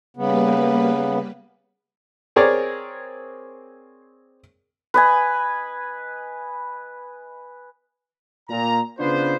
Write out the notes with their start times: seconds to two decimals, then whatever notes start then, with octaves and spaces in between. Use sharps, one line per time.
0.17 C#3 G3 A#3 B3 B4
2.36 C4 G#4 A#4 C#5 D5
4.94 B4 D#5 G#5
8.50 A#2 A#5
9.00 C#3 B3 D4 F4 B4 C5